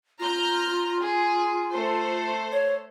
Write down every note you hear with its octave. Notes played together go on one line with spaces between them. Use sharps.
F4 A#5 F6 G6
G#4
A3 A4 C5
C#5